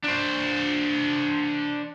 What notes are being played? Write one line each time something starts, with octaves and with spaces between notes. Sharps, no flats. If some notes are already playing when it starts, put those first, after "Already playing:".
D4 C5